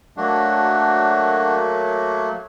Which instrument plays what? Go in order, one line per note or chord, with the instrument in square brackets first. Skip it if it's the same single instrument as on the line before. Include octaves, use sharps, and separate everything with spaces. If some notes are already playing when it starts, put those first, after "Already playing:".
[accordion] F#3 A3 A#3 [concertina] D4 F#4